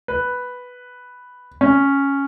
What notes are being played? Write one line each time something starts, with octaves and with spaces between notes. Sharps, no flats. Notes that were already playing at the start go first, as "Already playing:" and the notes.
B4
C#4